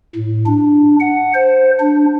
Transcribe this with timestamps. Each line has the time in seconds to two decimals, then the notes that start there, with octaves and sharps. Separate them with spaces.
0.15 A2
0.46 D4
1.00 F#5
1.35 C5
1.80 D4